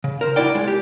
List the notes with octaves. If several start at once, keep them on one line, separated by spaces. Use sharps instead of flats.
C#3
A#4 C5
C#2 C3 E4 F#4 D5 G5
G#3
G4